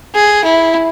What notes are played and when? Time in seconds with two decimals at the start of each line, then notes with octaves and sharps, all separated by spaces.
0.16 G#4
0.44 E4